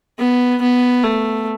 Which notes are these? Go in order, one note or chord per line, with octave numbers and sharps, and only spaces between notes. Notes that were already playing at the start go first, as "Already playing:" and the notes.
B3
B3
A3